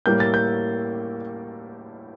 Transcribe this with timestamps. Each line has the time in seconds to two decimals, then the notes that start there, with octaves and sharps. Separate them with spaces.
0.06 A2 G3 A#3 G6
0.20 A6
0.34 G6